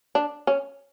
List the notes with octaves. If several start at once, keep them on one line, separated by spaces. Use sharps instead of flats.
D4
C#4